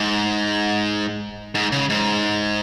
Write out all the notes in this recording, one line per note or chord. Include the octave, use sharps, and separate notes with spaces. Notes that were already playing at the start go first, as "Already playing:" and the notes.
Already playing: G#2
G#2
C#3
G#2